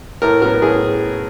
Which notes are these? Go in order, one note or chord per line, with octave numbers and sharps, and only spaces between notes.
A2 A#4
F#3 B3 A#4
A2 G#4